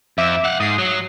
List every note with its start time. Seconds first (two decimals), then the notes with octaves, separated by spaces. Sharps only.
0.18 F2 E5 D6 E7
0.44 F5 F#5
0.60 G#2 D#6 C7
0.78 F#3